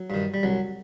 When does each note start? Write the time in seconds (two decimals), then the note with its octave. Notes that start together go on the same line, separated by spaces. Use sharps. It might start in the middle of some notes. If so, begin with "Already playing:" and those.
Already playing: F#3
0.10 G2 D#3
0.34 G3
0.43 C2 F#3